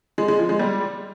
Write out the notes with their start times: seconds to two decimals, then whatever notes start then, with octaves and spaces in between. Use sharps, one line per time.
0.18 G#3
0.28 G#3
0.39 F3
0.49 G#3
0.59 G3